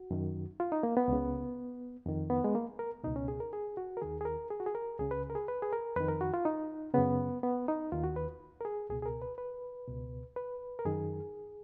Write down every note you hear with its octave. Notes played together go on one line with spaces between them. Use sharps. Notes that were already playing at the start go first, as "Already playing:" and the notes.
Already playing: F#4
F#2 D#3
F4
D#4
A#3
B3
C#2 C#3
F2 D#3
B3
G#3
A#3
A#4
C#2 B2 D#4
C#4
G#4
A#4
G#4
F#4
A#4
D#2 D#3 G#4
G#4
A#4
G#4
F#4
G#4
A#4
C#2 C#3 G#4
B4
A#4
G#4
B4
G#4
A#4
F2 D#3 B4
A#4
F#4
F4
D#4
F#2 C#3 B3
B3
D#4
D#2 D#3 F4
F#4
B4
A#4
G#4
C#2 B2 G#4
G#4
A#4
B4
B4
C#2 B2
B4
A#4
F#2 D#3 G#4